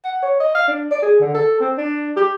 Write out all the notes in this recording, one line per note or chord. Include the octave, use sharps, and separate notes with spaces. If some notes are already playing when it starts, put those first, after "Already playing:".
F#5
C#5
D#5
F5
D4
D5
G#4
D3
A4
C4
D4
G4